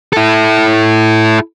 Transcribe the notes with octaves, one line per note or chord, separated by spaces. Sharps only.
E4 A4